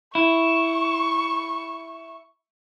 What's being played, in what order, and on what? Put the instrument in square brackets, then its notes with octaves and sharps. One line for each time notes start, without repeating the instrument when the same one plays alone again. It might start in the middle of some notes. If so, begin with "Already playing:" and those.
[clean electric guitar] E4 [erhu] C#6